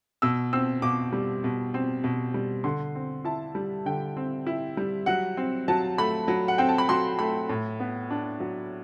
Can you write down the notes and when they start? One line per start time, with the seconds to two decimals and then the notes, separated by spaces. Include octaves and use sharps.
0.22 B2 E6
0.53 C4 E6
0.82 B2 D6
1.12 G3
1.44 B2
1.74 C4
2.04 B2
2.34 G3
2.64 D3 C6
2.95 C4
3.25 E4 A5
3.55 G3
3.86 D3 G5
4.17 C4
4.47 E4
4.77 G3
5.06 F#3 F#5
5.37 C4
5.68 F#3 A5
5.98 A3 B5
6.28 F#3
6.48 F#5
6.58 C4 G5
6.69 A5
6.78 B5
6.89 F#3 C6
7.19 A3 B5
7.49 A2
7.80 B3
8.10 D4
8.40 F#3